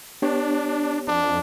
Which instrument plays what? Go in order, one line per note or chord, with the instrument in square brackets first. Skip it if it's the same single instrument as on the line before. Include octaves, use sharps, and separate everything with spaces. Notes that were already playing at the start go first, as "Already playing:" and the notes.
[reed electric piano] B3 G4 C#5 [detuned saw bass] D4
[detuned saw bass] F2 [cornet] D4